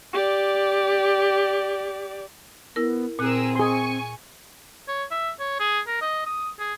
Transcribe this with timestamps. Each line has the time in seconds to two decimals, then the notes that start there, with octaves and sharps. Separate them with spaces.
0.13 G4 D5
2.76 B3 E4 A#4
3.19 A#2 C4 G#4 A#4 E6 F#6
3.55 G#4 G#5 C6 C#6
4.88 C#5
5.11 E5
5.39 C#5
5.59 G#4
5.87 A#4
6.01 D#5
6.26 D#6
6.59 G#4